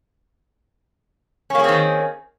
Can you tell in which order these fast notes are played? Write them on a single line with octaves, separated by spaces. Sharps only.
C#4 A#3 G#4 C4 D#3